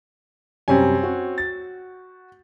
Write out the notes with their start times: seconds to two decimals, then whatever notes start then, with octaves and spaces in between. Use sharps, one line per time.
0.68 F#2 C3 G3 C4 C#4 G#5
1.03 F#4
1.38 A6